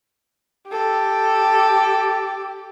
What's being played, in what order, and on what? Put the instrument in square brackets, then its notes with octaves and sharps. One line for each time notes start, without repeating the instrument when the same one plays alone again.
[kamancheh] G4 A4